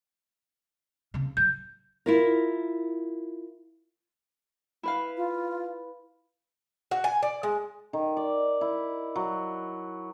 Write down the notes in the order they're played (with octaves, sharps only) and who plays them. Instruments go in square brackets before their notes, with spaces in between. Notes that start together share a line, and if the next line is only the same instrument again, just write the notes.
[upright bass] C#3 C4
[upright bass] F#3 [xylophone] G6
[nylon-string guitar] E4 F4 A#4
[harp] E4 B4 F5
[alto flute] F4
[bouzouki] F#4
G#5
D5
G#3
[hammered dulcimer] D#3
D5
E4
F#3